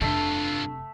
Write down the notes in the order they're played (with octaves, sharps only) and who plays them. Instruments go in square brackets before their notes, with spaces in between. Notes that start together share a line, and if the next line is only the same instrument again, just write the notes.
[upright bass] F1 C3 [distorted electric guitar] G2 F4 [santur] A3 E5 [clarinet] D4